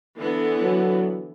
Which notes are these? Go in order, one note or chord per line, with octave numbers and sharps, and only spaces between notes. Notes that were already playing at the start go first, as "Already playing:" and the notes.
D3 E3 B3
F#3